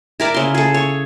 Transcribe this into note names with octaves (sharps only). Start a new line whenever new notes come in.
E4 A#4 D5
C#3 C6
G#4 A4
C#5